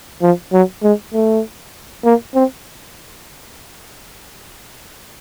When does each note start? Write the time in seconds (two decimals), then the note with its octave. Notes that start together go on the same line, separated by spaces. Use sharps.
0.22 F3
0.53 F#3
0.83 G#3
1.14 A3
2.05 A#3
2.35 C4